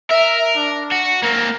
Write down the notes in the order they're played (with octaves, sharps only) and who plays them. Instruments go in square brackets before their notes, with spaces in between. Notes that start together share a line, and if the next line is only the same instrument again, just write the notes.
[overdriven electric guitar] A#4 [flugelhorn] E5
[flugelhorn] D4
[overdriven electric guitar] F#4
[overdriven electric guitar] A#3 C4 [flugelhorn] A#4